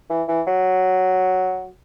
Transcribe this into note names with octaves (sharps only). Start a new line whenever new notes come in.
E3
E3
F#3